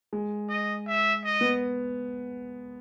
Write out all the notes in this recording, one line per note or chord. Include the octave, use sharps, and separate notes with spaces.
G#3
D#5
E5
D#5
B3